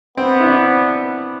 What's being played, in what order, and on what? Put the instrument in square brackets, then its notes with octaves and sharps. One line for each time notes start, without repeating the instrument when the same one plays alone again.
[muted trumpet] B3 [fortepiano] C4
[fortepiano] E4
D4